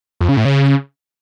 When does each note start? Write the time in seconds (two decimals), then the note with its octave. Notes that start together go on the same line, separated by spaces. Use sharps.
0.21 F2
0.29 C#3
0.37 A2
0.45 C#3